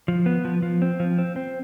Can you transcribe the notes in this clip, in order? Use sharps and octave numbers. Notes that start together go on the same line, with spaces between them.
F3
B3
F3
F3
C4
F3
C4
C4